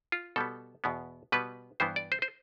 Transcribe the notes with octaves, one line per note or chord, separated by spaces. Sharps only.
F4
B2 G3 B3 A4
E2 B2 B3
B2 G3 B3 B4
G2 E3 B3 C5
D5
C5
C5